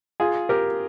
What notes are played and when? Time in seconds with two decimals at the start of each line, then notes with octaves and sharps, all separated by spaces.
0.20 F4 G#4
0.49 G4 A#4